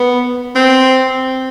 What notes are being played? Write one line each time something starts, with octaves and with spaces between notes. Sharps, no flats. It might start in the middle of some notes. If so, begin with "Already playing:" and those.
Already playing: B3
C4